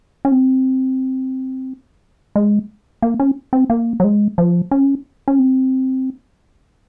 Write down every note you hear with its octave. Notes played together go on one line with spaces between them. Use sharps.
C#4
C4
G#3
A#3
C#4
C4
A#3
F#3
G#3
F3
C#4
C#4
C4